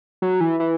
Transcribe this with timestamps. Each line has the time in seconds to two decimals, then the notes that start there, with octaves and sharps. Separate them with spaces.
0.22 F#3
0.41 E3
0.60 E3